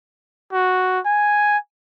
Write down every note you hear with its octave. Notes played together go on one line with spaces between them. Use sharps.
F#4
G#5